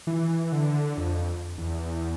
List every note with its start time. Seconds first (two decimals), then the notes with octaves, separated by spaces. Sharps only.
0.07 E3
0.52 D3
0.98 F2
1.58 E2